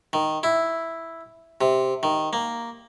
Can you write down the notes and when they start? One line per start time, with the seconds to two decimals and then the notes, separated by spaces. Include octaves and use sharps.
0.13 D#3
0.43 E4
1.61 C3
2.03 D#3
2.33 A#3